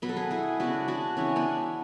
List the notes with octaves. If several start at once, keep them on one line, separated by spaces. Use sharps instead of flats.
B2 F#3 B3 B4
A4
G#4 B4
E4 G#4
C#3 G#3 B3 D4 F#4
D4 F#4
C#3 E3 G#3 C#4 E4
B3 D4